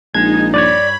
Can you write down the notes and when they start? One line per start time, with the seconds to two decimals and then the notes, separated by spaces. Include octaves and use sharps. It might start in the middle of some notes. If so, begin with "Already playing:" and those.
0.14 A#1 G#3 D#4 G#6
0.54 G2 B4 C#5 D5 B5